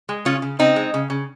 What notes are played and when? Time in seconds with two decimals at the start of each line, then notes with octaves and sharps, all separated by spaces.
0.09 G#3
0.25 C#3 C#4 F4
0.42 C#3
0.59 C#3 C4 D#4
0.76 G#3
0.94 C#3
1.10 C#3